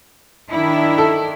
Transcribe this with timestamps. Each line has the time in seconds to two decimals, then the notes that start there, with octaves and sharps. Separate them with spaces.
0.50 D#3 D4 E4
0.98 A4